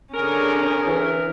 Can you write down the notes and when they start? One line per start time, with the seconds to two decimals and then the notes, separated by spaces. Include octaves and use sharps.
0.14 D3 C#4 G#4 A#4
0.87 E3